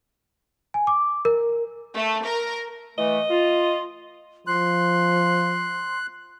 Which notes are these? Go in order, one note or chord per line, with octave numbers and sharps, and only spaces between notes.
G#5
D6
A#4
A3
A#4
E3 A3 D#5
F4
F3 C6 F#6